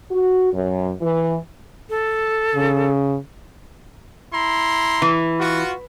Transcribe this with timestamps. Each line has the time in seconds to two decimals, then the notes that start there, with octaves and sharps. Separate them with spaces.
0.11 F#4
0.52 F#2
1.01 E3
1.90 A4
2.55 C#3
4.34 E4 A#5 C6
5.02 E3
5.40 F4 F#4